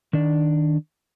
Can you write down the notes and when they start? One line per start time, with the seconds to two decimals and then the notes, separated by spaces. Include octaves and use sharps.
0.13 D#3 D4 D5